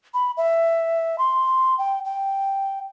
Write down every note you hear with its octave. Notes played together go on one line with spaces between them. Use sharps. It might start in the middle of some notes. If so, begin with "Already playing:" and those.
B5
E5
C6
G5
G5